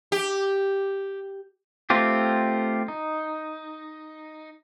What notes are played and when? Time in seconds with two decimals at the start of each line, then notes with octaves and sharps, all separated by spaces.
0.12 G4
1.90 A3 C4 F4 G4
2.88 D#4